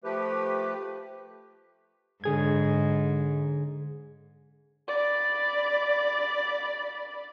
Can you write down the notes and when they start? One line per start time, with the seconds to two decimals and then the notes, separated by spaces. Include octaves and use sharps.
0.04 F3 A3 G4 B4
2.24 G#2 D3 G#4 G#6
4.88 D5 B5